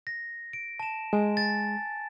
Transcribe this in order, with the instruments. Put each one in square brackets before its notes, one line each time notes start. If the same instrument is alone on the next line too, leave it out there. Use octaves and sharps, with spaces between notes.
[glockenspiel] A#6
D7
A5 E7
[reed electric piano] G#3 [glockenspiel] G#5
[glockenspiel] A6